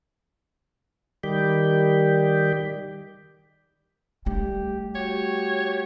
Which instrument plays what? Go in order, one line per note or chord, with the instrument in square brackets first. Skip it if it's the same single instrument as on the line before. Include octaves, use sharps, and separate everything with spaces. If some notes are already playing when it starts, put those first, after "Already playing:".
[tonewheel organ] D#3 G3 G4
[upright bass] G3 A3 [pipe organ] G4
[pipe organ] F#4 G4 [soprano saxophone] C#5